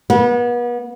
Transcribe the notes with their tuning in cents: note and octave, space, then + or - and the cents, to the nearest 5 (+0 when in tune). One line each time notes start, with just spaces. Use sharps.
B3 -35